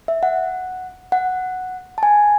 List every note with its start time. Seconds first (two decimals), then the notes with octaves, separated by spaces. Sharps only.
0.08 E5
0.23 F#5
1.12 F#5
1.98 A5
2.03 G#5